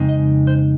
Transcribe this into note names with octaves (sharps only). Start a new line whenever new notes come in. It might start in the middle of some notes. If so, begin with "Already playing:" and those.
Already playing: F2 C#3 G#3 C4 D#4
D#5
C5